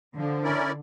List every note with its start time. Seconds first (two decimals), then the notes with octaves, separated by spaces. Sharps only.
0.15 D3 F3
0.43 C#4 E4 A#4 D5